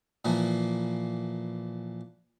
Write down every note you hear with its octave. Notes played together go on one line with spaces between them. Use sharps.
A#2 E3 F3 A#3